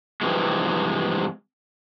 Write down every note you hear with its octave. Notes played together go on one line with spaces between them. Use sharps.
G2 C3 E3 F3 G#3